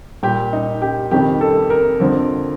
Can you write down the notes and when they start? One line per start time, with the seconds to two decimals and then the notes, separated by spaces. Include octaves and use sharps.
0.23 A#2 G3 G4
0.53 D#4
0.82 G4
1.11 F2 C3 D#3 G3 G4
1.41 A4
1.70 A#4
2.00 F2 D3 F3